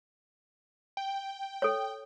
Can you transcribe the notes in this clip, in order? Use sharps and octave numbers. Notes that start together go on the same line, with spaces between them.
G5
A4 C#5